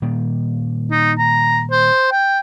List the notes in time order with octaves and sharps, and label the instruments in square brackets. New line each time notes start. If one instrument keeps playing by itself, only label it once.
[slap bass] A#2 D#3 G3
[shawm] D#4
A#5
C5
G5